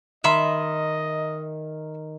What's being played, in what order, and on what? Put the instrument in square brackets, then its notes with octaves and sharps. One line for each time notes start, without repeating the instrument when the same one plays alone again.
[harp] D#3 [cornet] D#5 [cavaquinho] E5 B5 C6